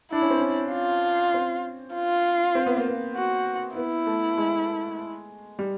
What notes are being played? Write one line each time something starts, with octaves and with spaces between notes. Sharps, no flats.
D4 E4
C#4
C4
C#4
F4
C4
F4
C4
B3
A#3
B3
F#4
B3 E4
A3
G#3
G3